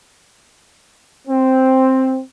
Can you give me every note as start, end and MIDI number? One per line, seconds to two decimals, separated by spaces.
1.28 2.20 60